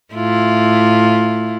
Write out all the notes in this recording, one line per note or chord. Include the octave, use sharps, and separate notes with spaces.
A2 E4 F4